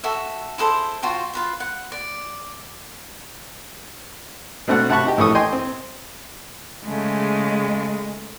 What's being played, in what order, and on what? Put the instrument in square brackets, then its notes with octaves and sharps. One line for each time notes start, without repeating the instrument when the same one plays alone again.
[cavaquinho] F#4 A4 E5
E4 G#4 A4 C5
F4 F#4 C5 G5
F4 B4 F5
F#5
D5
[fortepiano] B2 A3 C4 D4 F#5
C3 F#5 A5 B5 C#6
D#4 G4
A#1 A2 E3 A4 C#6 D#6
D#5 G5 G#5 C6
C4
[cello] C#3 A3 [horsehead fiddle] G#3